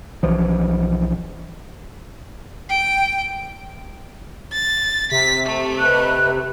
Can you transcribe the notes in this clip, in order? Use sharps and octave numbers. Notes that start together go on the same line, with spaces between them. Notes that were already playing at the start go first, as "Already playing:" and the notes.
B1 E3 F3
G5
A6
C3 B6
A3
B4 D#5 F#6